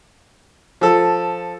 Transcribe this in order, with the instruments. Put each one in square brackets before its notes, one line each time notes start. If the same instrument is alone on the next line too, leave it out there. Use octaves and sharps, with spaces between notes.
[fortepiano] F3 A4